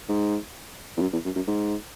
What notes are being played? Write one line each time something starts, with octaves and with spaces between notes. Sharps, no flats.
G#2
E2
F#2
E2
F#2
F#2
G#2